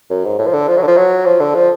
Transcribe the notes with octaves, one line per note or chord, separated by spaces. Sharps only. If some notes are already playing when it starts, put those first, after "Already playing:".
F#2
G#2
A2
F3
D3
F3
F#3
D3
F3
F#3
F3
D3
F3